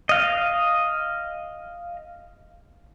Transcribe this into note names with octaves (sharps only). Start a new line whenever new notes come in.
D#5 F5